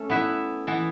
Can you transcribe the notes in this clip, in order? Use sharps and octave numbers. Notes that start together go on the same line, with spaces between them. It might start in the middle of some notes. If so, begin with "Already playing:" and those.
Already playing: A3 C#4 A4
B3 E4 B4 E5
E3 B3 E4